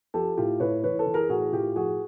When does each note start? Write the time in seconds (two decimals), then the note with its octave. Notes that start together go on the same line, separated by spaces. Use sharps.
0.14 F3 G4 A4
0.37 A2 F4 G4
0.60 A2 B4 C#5
0.84 E3 B4 C#5
0.99 A4 B4
1.06 E3
1.14 G#4 A#4
1.29 A2 F#4 G#4
1.53 A2 F4 G4
1.76 F3 F#4 G#4